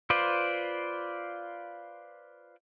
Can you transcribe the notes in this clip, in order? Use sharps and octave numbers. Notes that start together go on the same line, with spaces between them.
F4 B4 C5 D5